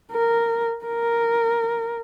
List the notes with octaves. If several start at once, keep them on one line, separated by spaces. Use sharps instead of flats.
A#4
A#4